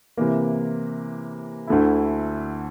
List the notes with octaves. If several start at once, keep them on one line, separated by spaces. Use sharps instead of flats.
C3 E3 A#3
D2 D3 A3 E4